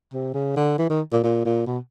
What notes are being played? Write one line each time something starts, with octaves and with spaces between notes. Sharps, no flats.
C3
C#3
D3
E3
D#3
A#2
A#2
A#2
B2